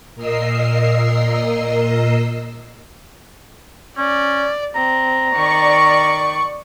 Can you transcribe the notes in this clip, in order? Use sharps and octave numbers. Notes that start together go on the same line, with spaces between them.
A#2 A#4 D#5 E6 C7
C#4 D5
C4 A#5
D#3 D5 C#6